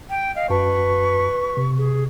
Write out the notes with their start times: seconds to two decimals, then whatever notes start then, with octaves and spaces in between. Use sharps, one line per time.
0.10 G5
0.36 D#5 F5
0.50 F#2 F#4 B4 A5 C#6
1.57 C3
1.78 G#4